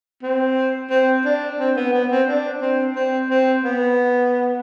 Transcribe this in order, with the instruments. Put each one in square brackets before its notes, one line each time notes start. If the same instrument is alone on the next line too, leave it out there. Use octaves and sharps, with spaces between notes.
[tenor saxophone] C4
C4
D4
C4
B3
B3
C4
D4
C4
C4
C4
B3